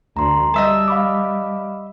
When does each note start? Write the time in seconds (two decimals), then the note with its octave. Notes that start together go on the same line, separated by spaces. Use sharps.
0.17 D2 A#5 C6
0.54 G3 D#5 E5 A5
0.88 F5 B5 D6